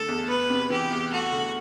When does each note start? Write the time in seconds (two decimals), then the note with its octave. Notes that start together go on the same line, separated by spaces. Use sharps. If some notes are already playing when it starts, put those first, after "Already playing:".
Already playing: D3 A3 A4
0.08 E2
0.29 B3 B4
0.50 C3
0.70 E3 G4
0.91 E2
1.12 A3 F#4
1.32 D3